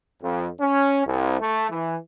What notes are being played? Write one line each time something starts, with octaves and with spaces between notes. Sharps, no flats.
F2
C#4
C2
A3
E3